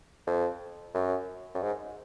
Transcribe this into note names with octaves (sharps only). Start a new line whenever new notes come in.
F2
F#2
F#2
G#2